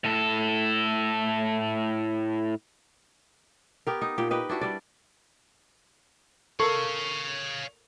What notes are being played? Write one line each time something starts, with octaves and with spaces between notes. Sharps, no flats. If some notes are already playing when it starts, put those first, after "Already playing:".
A2 A4
B3 G4 A#4
D#4
A#2 G4
G4 B4 D#5
D4 E4 F#4 G4
G3 D5
A4 A#4 C#5 F5 C#6